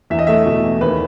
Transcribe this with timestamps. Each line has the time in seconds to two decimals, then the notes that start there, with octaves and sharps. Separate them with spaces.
0.10 E2 E5
0.19 D#5
0.27 A3 E5
0.46 B2
0.64 E2
0.81 D#2 B4